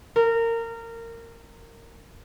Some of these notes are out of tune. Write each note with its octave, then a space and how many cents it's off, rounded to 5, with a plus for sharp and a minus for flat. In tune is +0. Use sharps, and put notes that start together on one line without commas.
A#4 -20